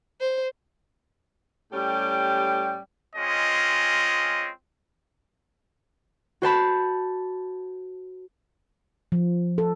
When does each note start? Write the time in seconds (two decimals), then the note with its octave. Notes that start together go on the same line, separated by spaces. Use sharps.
0.21 C5
1.72 A2 G3 C#4 G4
3.16 G#3 C4 C#4 F4 D#5
6.42 F#4 C5 A5 B5
9.12 F3
9.58 A4